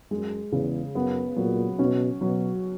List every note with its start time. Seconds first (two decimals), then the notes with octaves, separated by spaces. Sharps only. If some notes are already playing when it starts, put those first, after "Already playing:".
0.11 F#2 G#3
0.52 E2 C#3
0.95 F#2 B3
1.37 A#2 F#3
1.79 B2 C#4
2.21 B2 F#3